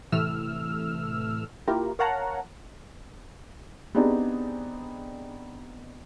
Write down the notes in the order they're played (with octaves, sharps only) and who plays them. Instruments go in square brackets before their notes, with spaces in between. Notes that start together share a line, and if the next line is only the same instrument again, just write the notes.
[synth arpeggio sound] A2 C3 E3 A3 E6 F6
A#3 E4 F4 G4 A#4
A#4 C#5 F5 F#5 A5 A#5
[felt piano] B3 C4 D4 D#4 G4 G#4